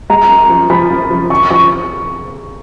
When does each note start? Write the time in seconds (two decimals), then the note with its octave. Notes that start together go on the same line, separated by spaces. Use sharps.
0.10 G#3 A#5
0.29 F#2
0.49 F3
0.70 F3 B5
0.90 F#2
1.10 F3
1.30 F#2 C#6
1.50 F3 C#6